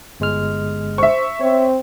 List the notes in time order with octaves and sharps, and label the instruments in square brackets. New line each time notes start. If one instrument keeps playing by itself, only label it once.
[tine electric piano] G1 G#3 F6
[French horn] C5 [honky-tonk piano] E5 C#6
[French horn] C4 [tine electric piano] C#5